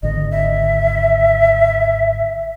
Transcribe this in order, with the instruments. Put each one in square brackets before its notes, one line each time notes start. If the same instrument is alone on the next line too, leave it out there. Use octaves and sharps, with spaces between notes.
[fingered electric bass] G#1 D3 [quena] D#5
[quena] E5